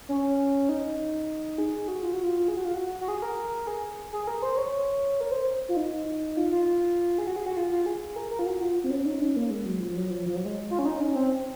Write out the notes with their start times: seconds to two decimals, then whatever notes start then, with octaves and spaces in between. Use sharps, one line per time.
0.09 C#4
0.69 D#4
1.58 G#4
1.88 F#4
2.03 F4
2.13 F#4
2.23 F4
2.48 G#4
2.57 F#4
2.65 F4
2.74 F#4
3.01 F#4
3.08 G#4
3.22 A#4
3.67 G#4
4.12 G#4
4.27 A#4
4.42 C5
4.57 C#5
5.21 A#4
5.32 C5
5.69 F4
5.77 D#4
6.37 F4
6.51 F4
7.18 G#4
7.27 F#4
7.36 G#4
7.46 F#4
7.57 F4
7.72 F4
7.86 G#4
8.16 A#4
8.31 A#4
8.39 F4
8.46 F#4
8.61 F4
8.84 C4
8.91 C#4
9.05 D#4
9.21 C#4
9.36 A#3
9.51 G#3
9.66 F#3
9.80 F3
9.96 F#3
10.11 F3
10.26 F3
10.36 F#3
10.45 G#3
10.70 F4
10.79 C#4
10.85 D#4
11.00 C#4
11.15 C4